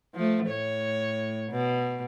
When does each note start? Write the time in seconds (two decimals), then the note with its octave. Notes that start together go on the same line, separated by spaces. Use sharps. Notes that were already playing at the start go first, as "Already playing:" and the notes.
0.15 F3 A3
0.47 A2 C#5
1.51 B2